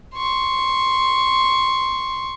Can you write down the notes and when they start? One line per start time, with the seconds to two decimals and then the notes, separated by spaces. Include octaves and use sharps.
0.15 C6 C#6